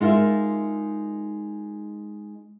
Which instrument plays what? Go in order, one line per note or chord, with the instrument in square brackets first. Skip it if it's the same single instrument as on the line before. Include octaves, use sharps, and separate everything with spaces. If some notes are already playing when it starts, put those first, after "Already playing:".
[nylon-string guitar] G#3 D#4 F4 A#4 E5